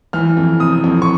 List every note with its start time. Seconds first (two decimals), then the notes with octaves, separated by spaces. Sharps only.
0.13 E3 F6
0.37 F2
0.60 C3 D#6
0.84 F2
1.02 C#6